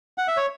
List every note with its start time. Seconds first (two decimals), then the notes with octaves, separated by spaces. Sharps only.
0.18 F#5
0.28 E5
0.37 C#5